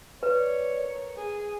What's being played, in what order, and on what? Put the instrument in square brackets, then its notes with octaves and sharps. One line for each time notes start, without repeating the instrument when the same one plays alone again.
[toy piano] B4 [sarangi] C#5 [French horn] D5
[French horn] A#4
[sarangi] G#4